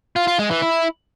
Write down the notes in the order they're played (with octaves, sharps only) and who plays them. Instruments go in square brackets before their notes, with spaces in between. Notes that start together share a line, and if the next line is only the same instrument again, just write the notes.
[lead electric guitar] F4
F4
G#3
E3
E4